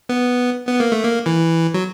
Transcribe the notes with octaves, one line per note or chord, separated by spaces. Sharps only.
B3
B3
A#3
A3
A#3
E3
F#3